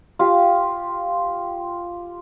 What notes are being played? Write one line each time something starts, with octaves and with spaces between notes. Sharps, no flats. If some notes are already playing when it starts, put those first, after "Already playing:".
F4 G4